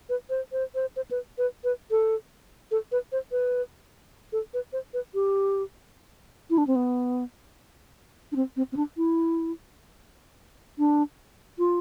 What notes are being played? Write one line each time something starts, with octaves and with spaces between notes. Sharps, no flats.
B4
C5
C5
C5
C5
B4
B4
B4
A4
A4
B4
C5
B4
A4
B4
C5
B4
G4
E4
D4
C4
B3
D4
C4
C4
C4
D4
E4
D4
F4